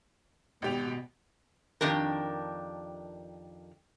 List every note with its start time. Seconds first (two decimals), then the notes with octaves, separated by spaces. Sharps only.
0.62 G#1 B2 G4 F7
1.81 F2 D#3 D4 G4 A#4